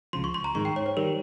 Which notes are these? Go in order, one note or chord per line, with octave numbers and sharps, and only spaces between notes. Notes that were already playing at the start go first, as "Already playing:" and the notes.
C#2 C#3 F3 C6
C#6
C6
A#5
G#2 D#3 G#3 C#6
G5
C#5
C5
D#3 G3 A#4